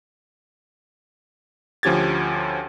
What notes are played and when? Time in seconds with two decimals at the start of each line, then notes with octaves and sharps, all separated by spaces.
1.83 D2 F3 C#4 G4 G#6 A6